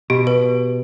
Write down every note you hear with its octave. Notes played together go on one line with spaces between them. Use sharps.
B2 G4
B4